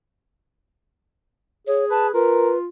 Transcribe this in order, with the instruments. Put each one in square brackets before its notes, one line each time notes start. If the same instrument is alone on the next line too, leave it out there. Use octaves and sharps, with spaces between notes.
[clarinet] G#4 [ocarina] C#5
[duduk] B4 [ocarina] A5
[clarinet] F4 [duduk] A#4 [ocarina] B4